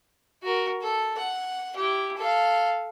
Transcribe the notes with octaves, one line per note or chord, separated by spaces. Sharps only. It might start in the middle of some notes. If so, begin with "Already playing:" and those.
F#4 A#4
A4
F#5
E4 G4
A4 F5